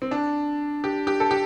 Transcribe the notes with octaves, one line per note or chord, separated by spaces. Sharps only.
C4
D4
G4
G4
A4
G4